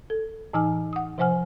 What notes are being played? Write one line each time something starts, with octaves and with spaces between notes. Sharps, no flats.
A4
A2 E3 D#4 G#5 F6
F#5 D#6
C3 F3 C5 F#5 G#5 F6